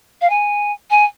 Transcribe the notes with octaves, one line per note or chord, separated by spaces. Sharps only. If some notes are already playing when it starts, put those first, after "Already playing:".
F5
G#5
G#5